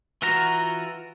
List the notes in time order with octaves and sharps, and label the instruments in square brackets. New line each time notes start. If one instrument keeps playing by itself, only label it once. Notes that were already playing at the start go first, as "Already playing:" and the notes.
[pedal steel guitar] E3 F4 F#4 A#5